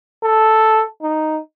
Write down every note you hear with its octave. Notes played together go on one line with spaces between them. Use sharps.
A4
D#4